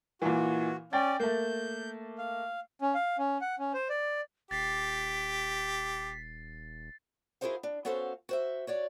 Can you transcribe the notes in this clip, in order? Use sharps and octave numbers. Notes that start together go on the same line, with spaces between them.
A#2 E3 F#4
C#4 D5 G5 A6
A3 A#3 G6
F5
C#4
F5
C#4
F#5
C#4
C5
D5
D#1 G4 A6 B6 C7
E4 F#4 G#4 A#4 C5 F5
D4
B3 C#4 F#4 A4 C5 F5
F#4 C5 E5
F#4 C#5 D5